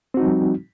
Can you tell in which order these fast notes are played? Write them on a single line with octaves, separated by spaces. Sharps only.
C4 F#4 D#4 F3 G3